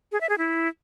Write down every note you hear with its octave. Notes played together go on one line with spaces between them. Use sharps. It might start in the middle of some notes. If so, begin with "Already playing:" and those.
G#4
E5
G#4
E4